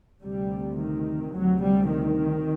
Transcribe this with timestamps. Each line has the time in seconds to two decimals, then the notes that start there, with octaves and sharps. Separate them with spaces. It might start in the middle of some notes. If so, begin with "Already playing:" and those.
0.20 D2 C3 G3
0.77 D#3
1.33 D2 C3 F#3
1.62 G3
1.89 D#3